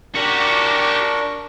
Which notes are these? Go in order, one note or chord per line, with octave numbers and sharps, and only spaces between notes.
D4 F#4 G4 A#4 C#6